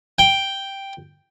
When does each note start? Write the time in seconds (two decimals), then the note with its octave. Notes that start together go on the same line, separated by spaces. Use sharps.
0.19 G5